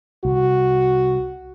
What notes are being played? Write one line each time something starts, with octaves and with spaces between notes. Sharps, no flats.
C2 F#4